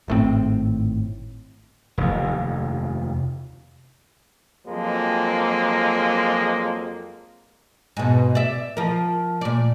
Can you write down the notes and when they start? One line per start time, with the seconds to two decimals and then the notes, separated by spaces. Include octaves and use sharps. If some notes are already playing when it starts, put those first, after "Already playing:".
0.08 G#1 A2 D#3 C4
1.98 F1 D#2
4.67 F2 F3 F#3 G#3 A#3
7.97 G#2 B2
8.35 D5 E5
8.77 F3 A#4
9.41 A#2 D5